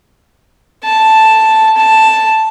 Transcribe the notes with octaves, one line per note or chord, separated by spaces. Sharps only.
A5
A5